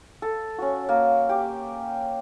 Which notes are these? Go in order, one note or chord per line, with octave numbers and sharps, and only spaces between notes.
A4
C#4 F#4
A#3
G4